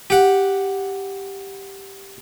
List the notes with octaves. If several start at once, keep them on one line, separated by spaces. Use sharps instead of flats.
G4 F#5